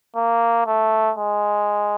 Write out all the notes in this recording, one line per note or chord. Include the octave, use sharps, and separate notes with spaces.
A#3
A3
G#3